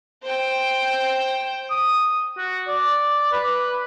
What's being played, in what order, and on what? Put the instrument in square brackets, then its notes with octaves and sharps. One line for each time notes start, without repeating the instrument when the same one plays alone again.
[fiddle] C5 G5
[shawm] D#6
F#4
D5
B4